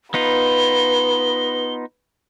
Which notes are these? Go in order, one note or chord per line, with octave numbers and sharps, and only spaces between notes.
B3 D#4 F4 B4 G7